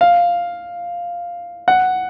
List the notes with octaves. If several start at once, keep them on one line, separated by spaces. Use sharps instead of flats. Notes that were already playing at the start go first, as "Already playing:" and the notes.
F5
F#5